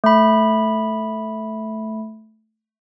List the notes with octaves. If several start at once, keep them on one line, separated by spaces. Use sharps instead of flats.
A3 B5